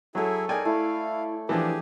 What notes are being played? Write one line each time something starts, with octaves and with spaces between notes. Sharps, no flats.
F#3 E4 G#4 A4 C#5
D#4 G#4 A#4 D5 G5 G#5
A3 E4 F5
E3 F3 D4 G4 G#4